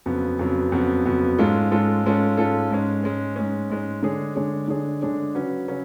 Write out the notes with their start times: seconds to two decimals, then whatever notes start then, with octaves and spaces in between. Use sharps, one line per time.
0.06 F2 C#3 F#3 B3
0.39 F2 C#3 F#3 B3
0.72 F2 C#3 F#3 B3
1.05 F2 C#3 F#3 B3
1.38 G#2 G#3 C#4 F4 A4
1.71 G#2 G#3 C#4 F4 A4
2.04 G#2 G#3 C#4 F4 A4
2.37 G#2 G#3 C#4 F4 A4
2.70 G#2 G#3 C#4
3.03 G#2 G#3 C#4
3.36 G#2 G#3 C#4
3.70 G#2 G#3 C#4
4.03 D3 G#3 D4 G#4 C#5
4.36 D3 G#3 D4 G#4 C#5
4.68 D3 G#3 D4 G#4 C#5
5.02 D3 G#3 D4 G#4 C#5
5.35 C#3 F#3 C#4 F#4 B4
5.68 C#3 F#3 C#4 F#4 B4